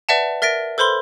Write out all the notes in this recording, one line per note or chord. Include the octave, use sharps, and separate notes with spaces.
B4 D5 E5 F#5 A5
A#4 E5 A6 A#6 D7
A4 B4 C5 B5 C6 G7